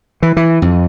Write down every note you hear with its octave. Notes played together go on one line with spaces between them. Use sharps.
E3
E3
F2